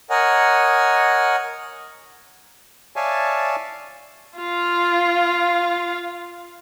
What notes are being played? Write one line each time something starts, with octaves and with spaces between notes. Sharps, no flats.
A#4 C#5 D#5 F#5 G#5
C#5 D5 E5 F5 G#5 A5
F4 F5